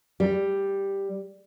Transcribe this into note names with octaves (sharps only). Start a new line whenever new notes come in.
G3